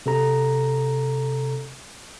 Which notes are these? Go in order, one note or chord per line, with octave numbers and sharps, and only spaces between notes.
C3 A4 A#5